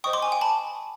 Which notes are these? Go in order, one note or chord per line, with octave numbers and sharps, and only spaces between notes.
C5 D#5 G5 C#6 D#6
C6 D6
G#5
G5
A5 B5